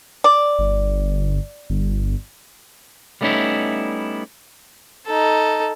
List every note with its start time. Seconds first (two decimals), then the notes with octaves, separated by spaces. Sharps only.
0.24 D5
0.59 G1
1.70 G1
3.21 G3 A3 B3 C#4 D#4 E4
5.06 D#4 A4